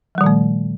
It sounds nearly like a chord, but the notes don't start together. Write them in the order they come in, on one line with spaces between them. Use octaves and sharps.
F3 G3 D#3 A#2 A3